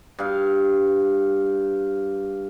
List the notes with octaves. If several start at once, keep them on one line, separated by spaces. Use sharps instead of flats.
G2 F5